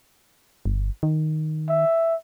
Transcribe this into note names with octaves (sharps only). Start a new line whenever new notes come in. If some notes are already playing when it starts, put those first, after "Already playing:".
G1
D#3
E5